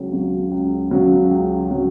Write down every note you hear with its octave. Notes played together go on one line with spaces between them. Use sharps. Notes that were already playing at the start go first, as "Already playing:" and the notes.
Already playing: C#2 C#3 F#3
C#3 F#3
C#2
C#3 F#3
C#2
C#3 F#3